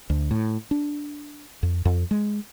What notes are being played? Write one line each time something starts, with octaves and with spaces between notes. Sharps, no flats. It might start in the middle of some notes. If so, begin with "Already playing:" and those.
D2
A2
D4
F2
F2
G#3